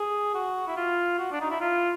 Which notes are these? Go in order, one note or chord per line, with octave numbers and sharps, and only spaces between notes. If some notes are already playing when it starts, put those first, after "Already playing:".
Already playing: G#4
F#4
E4
F4
F#4
D4
D#4
E4
F4